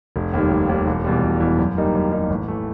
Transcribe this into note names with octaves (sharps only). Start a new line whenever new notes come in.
F1
D#2 D#3 G3
F1
D#2 D#3 G3
E1
E2 B2 G3
E1
E2 B2 G3
F#2
D#3 G3 A#3 D#4
F#2
D#3 G3 A#3 D#4
A1
E3 A3